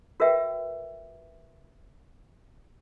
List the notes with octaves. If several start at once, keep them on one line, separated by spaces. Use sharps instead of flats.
F#4 A#4 B4 E5 G5